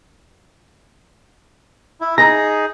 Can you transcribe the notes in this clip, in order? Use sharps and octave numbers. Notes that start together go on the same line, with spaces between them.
E4
D#4 G#4 A#5